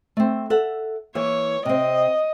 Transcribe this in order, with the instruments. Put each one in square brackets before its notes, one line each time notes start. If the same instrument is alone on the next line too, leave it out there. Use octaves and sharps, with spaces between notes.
[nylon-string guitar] A3 C4
A4 E5 F#5
[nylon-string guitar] E3 A#3 E5 [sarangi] C#5
[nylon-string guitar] C3 C4 [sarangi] D#5